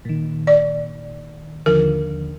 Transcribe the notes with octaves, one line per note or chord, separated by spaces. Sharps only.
A#2 D#3
D5
D#2 D3 F3 A#4